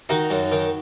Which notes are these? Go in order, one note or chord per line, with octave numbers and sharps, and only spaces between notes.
D#3 D#4 F#4
F#2
D#3